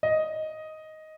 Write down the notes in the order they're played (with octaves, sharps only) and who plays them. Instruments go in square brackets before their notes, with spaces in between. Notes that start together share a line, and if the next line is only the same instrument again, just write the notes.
[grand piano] D#5